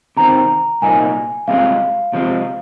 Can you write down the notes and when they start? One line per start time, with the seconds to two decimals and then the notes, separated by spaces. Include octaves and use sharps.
0.17 C3 D#3 C4 A#5
0.82 C2 A#2 A#3 D#4 G#5
1.48 C2 C3 G#3 F4 F5
2.13 C3 F3 G#3